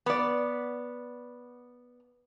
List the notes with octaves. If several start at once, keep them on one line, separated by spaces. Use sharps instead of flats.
B3 D5